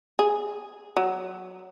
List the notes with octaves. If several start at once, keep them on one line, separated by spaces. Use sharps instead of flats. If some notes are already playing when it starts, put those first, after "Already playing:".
G#4
F#3